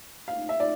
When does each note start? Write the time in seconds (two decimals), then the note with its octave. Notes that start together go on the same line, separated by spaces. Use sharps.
0.28 F5
0.49 E5
0.60 D5